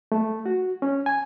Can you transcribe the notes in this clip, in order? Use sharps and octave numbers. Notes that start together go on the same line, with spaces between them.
A3
F#4
C#4
G#5